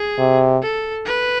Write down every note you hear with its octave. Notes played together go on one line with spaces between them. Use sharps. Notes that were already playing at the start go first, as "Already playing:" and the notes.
Already playing: G#4
C3
A4
B4